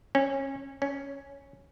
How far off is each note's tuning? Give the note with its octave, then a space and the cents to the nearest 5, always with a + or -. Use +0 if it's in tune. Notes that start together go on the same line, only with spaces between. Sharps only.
C#4 -20
C#4 +5